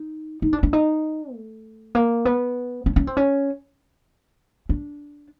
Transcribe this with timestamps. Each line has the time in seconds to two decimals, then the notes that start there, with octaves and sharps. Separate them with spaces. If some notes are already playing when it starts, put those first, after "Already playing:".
Already playing: D#4
0.42 D#4
0.53 D4
0.63 D4
0.73 D#4
1.33 A3
1.95 A#3
2.25 B3
2.86 C#4
2.96 C#4
3.07 C4
3.17 C#4
4.69 D4